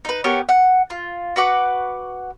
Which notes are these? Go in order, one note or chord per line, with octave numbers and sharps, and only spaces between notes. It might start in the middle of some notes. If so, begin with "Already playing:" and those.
D#4 B4
B3 G4 A#4 C#5
F#5
F4
F#4 B4 F#5 D6